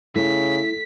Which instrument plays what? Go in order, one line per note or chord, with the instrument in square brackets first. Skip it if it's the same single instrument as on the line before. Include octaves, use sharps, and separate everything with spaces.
[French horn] C#3 [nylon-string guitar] A3 [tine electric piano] E4 [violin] B6